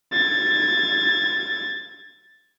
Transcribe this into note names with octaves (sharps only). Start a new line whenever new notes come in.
G#6 A6